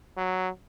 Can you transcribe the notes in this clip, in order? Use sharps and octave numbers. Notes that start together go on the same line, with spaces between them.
F#3